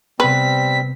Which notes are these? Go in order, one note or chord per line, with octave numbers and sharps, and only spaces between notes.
C3 G3 B3 C4 B4 B6